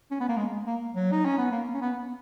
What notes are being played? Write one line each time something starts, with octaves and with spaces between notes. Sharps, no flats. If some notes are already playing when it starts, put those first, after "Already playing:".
C#4
B3
A#3
G#3
A#3
F#3
D#4
C#4
B3
A#3
C#4
B3